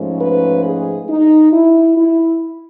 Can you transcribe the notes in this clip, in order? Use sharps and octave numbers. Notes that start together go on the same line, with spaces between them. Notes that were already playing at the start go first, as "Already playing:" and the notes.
Already playing: G#2 F3 A3 C#4
B4
G#4
D#4
E4
E4